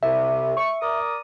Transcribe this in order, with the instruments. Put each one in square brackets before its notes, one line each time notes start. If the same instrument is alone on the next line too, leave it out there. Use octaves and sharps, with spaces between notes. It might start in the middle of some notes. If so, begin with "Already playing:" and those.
[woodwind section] C2 C3 [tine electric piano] E5
[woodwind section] C#6
A#4 D5 D#6